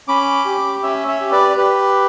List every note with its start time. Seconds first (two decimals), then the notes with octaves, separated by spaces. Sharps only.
0.08 C#4 B5 D6
0.45 G4
0.83 C#4 C#5 E5
1.08 C#5 E5
1.21 G4
1.32 B4 D5
1.57 G4 B4